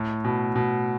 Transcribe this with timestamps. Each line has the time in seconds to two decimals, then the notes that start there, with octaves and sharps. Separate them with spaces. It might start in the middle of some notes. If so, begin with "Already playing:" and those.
Already playing: A2
0.24 B2
0.56 B2